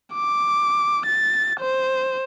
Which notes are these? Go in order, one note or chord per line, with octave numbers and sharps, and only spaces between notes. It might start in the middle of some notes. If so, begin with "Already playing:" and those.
D6
A6
C5